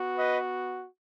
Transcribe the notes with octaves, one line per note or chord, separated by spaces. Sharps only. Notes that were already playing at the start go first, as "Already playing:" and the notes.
Already playing: B3 F#4
B4 D#5